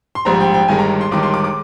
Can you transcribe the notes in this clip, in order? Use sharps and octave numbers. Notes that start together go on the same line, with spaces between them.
C6
A#1 G#2 G3 A#5
G5
G5
G1 G2 D#3 G#3 G#5
A#5
C6
G1 G2 D#3 G#3 D6
C6
D6
D6